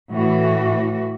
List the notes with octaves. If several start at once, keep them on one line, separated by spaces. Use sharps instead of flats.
A2 E3 F#4